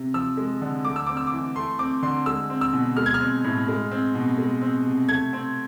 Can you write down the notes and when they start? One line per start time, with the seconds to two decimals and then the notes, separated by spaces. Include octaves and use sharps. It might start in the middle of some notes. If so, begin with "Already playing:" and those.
Already playing: C3
0.14 F3 E6
0.37 G#3
0.62 D3
0.85 A3 D6
0.96 E6
1.07 C4 D6
1.17 E6
1.27 D6
1.32 E3
1.56 A3 C6
1.79 C4 D6
2.02 D3 C6
2.26 G#3 E6
2.50 C4
2.61 E6
2.74 B2
2.97 G#3 F6
3.06 G#6
3.14 F6
3.21 C4
3.44 A2
3.68 G#3
3.91 C4
4.15 B2
4.38 G#3
4.61 C4
4.86 C3
5.08 A3 G#6
5.33 C4